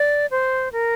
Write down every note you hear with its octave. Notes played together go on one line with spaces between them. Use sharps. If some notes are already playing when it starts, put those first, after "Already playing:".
Already playing: D5
C5
A#4